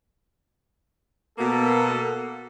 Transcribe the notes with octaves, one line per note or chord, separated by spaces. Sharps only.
B2 A#3 A4